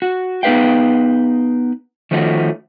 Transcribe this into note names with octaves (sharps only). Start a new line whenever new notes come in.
F#4
B3 D#4 G#4 B4 F5 G5
D#3 F3 A3 C#4 F4 F#4